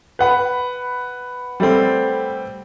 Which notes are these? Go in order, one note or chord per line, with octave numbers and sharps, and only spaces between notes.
B4 F#5 B5
G3 A3 C4